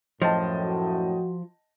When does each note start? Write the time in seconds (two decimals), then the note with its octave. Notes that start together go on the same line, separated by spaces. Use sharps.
0.22 F#2 A2 F3 D#5 G5 A5
0.62 F#4